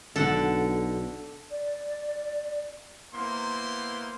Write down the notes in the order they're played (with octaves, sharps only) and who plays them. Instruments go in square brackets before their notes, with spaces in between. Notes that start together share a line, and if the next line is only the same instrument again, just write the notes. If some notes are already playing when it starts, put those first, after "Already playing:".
[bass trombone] B1 [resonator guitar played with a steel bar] D3 [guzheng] A4 F#5 A5
[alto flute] D5
[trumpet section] A#3 B3 E4 C5 C6